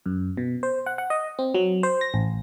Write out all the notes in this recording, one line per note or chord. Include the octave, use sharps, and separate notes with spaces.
F#2
B2
C5
F#5
F#5
D#5
C4
F#3
C5
A#6
A1